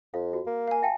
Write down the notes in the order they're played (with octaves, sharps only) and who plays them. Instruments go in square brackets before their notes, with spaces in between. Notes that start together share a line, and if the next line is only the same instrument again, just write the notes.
[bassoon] F2 [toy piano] F5
[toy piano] F#4
[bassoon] A#3
[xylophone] F5 G#5
[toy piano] E5 G5 A5